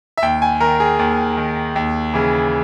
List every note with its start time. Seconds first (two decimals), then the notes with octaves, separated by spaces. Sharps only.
0.17 E5
0.22 D#2 G5
0.42 G#5
0.60 D#3 A#4
0.80 G#4
0.99 D#2
1.37 D#3
1.76 D#2
2.14 C#3 E3